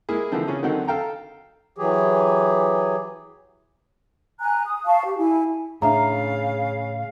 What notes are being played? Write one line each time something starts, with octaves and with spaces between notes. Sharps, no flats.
G#3 A#3 E4 G#4
D3 E3 F3 C4
C#3 C#4 G#4
D3 D#3 F#3 C4 D#4 F#5
A4 F5 G5 A#5
E3 F#3 G4 G#4
G#5 A#5 F#6
D#6
F5 A5 C#6
G4
E4 G#5
A2 C#3 D4 E5 F5 A#5